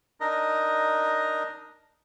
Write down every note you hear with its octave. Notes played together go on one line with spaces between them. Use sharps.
D4 D#4 A#4 D#5